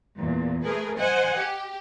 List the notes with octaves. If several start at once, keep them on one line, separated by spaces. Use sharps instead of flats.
E2 A#2
A3 G#4 A#4 B4
C5 D#5 F#5 G#5
G4